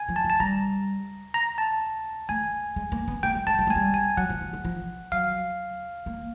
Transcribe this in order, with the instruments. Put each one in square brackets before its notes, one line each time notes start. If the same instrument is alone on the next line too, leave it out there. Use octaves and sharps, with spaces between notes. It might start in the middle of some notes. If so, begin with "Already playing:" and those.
Already playing: [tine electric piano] G#5
[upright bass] F3
[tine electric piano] A5
[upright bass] F3
[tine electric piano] A5
[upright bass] G3 [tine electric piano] A#5
[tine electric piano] A#5
A5
[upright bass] A3 [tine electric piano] G#5
[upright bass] G#3
A#3
B3
[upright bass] A#3 [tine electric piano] G5
[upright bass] G#3
[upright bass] G#3 [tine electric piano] A5
[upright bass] G3
G#3
[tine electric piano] G#5
[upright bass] G3
[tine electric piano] G#5
[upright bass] F#3 [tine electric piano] F#5
[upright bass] F3
F3
E3
F3
[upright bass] F#3 [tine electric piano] F5
[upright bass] A#3